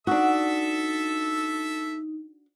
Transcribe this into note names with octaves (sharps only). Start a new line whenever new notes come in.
D4 D#4 F#4 A4 E5 E6